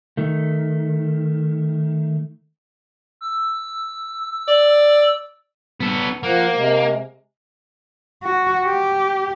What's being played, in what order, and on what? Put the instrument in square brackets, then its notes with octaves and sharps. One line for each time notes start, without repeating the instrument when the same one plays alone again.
[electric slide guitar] D#3 A3
[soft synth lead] E6
[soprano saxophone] D5
[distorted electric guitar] B3 A4
[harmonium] F3 F#5 [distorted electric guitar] A#3
[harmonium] C3 G#3
[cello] F#4
G4